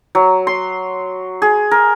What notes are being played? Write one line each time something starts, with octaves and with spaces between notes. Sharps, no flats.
F#3
C6
G#4
A#4